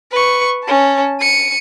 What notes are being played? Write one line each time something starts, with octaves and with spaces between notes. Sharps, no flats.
B4 C#6
C#4 A5
C#7 D#7